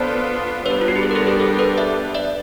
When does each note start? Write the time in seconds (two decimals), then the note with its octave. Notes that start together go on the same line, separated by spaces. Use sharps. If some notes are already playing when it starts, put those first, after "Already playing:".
Already playing: B3 D4 F4 A4 C5 D5
0.66 G3 B3 D4 B4 C#5
0.81 F4
0.88 F#4
0.96 G4
1.03 G#4
1.11 A#4
1.15 G4 A4
1.27 G#4 A#4
1.40 G4 A4
1.59 A4 B4
1.77 D5 E5
2.15 D5 E5